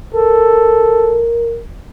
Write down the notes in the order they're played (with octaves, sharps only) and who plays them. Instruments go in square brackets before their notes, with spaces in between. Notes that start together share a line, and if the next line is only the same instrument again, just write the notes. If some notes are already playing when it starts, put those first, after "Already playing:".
[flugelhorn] A4 [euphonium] A#4